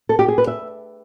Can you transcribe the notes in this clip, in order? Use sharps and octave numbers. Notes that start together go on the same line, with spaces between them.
A4
G4
G#4
B4
E5